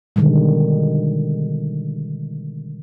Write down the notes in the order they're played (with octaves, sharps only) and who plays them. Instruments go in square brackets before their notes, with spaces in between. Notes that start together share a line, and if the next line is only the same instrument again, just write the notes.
[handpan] B2 D3 D#3 G3 G#3